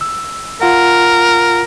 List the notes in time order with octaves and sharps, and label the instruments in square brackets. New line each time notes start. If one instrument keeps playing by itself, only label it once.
[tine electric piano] E6
[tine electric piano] F4 F#5 [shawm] A#4